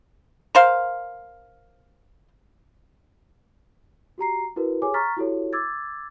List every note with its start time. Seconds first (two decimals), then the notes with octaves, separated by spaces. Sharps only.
0.55 A#4 C5 F5
4.18 F#4 G4 A#5 C7
4.56 E4 F#4 A#4 B4
4.82 G4 G#4 C#5 G#5 D6
4.94 A#5 C#6 F6 A6 B6
5.17 E4 F#4 G4 A4 C#5
5.53 D6 E6 G#6 A6